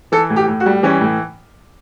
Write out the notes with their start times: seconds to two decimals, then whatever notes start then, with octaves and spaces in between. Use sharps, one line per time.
0.12 E3 A4
0.30 A2
0.36 G4
0.48 A2
0.60 F#4
0.66 G3
0.83 E3 C#4
1.01 A2